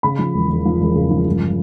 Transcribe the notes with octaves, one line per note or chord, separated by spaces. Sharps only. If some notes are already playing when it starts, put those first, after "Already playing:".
C#3 B5
F3
E1
E1
F3
E1
C#3
F3
G1